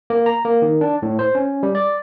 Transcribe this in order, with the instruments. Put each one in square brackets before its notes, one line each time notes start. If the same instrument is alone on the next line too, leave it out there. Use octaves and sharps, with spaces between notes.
[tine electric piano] A#3
A#5
A#3
D#3
D4
A2
C5
C#4
G3
D5